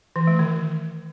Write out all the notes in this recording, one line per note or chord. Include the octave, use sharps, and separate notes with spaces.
E3
A3
D#3